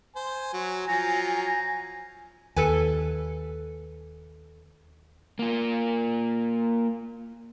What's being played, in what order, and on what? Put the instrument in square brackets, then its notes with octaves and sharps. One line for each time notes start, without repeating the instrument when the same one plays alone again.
[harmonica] C5 [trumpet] G#5
[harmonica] F#3
[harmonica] F3 F#3 [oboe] A#5
[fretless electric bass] D#2 [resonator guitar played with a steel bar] A4 B4 G#5
[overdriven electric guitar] A#3 F4